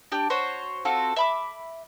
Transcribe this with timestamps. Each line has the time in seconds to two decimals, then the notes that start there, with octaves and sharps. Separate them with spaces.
0.12 D4 G4
0.30 F#4 C5 C#5
0.85 C4 F4 F#4 A4
1.16 E5 B5 D6